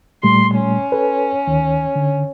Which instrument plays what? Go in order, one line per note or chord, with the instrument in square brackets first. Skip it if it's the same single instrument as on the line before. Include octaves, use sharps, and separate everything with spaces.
[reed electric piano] A#2 G3 A3 [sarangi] C6
[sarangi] C#4
[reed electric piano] A4 B4
D2 D#3
D3